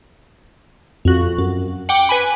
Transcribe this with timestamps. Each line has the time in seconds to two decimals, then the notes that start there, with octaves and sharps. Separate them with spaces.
1.05 F2 F#4
1.38 F#2
1.89 F#5 G5 D6
2.09 B4 G#5 B5